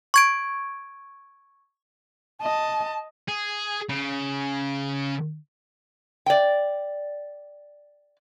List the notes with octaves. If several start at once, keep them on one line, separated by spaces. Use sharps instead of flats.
C#6 G#6 D7
D#5 A5
G#4
C#3
D5 G5